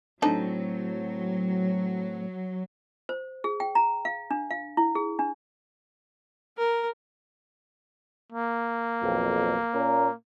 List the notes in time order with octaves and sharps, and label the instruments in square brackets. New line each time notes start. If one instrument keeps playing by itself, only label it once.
[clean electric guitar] A2 C4 [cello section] F#3 [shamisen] D4 D#4 A4
[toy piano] C5
G#4
G5
A#5
F5
D4
F5
E4
G#4
D4
[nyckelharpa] A#4
[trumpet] A#3
[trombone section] B1 F2
A#2 C#4 A#4